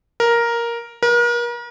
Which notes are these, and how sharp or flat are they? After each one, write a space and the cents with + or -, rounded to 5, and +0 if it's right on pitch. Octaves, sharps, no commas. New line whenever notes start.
A#4 +5
A#4 +40